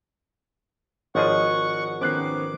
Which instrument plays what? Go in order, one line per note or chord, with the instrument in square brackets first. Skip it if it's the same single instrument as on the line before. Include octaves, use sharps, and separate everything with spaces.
[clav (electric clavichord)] G#1 F3 G#4 [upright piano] C#5 D#5 [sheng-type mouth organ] F#5 C#6
[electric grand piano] D#3 B3 C#4 [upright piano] C5 F#6 C7 [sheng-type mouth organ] D6